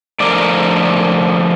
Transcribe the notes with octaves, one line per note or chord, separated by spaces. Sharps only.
D3 F3 A3 A#4 D5